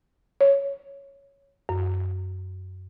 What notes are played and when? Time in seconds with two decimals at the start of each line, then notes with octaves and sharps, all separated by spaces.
0.41 C#5
1.69 F#2